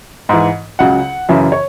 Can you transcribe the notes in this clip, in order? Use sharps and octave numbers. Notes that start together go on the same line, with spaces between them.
G#2 E3
C#2 C#3 F#3 F#5
F#2 C#3 E3 E5
C#5